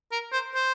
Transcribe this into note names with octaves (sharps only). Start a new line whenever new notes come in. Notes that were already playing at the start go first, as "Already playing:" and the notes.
A#4
C5
C5